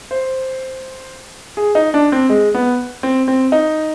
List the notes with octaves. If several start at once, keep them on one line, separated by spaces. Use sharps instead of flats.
C5
G#4
D#4
D4
C4
G#3
B3
C4
C4
D#4